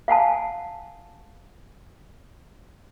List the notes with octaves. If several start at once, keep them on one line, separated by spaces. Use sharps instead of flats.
F5 F#5 G#5 A5